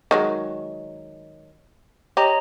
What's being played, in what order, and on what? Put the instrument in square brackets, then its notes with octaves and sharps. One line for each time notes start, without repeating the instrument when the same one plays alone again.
[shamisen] D#3 F#3 G#3
[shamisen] G4 [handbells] C#5 D#5 A#5